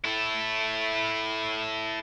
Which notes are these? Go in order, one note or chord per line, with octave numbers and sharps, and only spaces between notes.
E4 A4